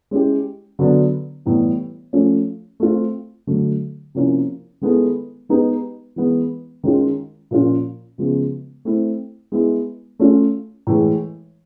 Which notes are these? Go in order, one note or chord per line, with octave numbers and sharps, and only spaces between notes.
G#3 C#4 E4 G4
D3 F#3 B3 D4
A2 E3 G3 B3
F3 A3 C#4
A3 C4 F4
D3 F#3 A3
C3 F3 A#3 C#4 E4
D#3 G#3 B3 E4 A4
G#3 B3 D#4 G4 B4
E3 G#3 B3
D#3 G#3 C#4 F4
A#2 F3 A#3 C#4 F4
C#3 F3 G#3 B3
A3 C4 E4
G#3 B3 E4
A3 C#4 F4
A2 E3 G#3